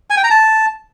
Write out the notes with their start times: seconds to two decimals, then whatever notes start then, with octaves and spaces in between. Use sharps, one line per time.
0.10 G#5
0.17 G5
0.24 A#5
0.31 A5